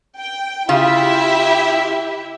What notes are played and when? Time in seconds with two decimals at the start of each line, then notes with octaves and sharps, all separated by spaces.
0.19 G5
0.69 C#3 E4 F4 G4 E5